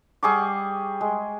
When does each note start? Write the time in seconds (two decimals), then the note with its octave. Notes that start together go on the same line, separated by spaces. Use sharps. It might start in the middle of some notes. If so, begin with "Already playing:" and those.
0.23 G3 G#4 C#6 D6
1.01 G#3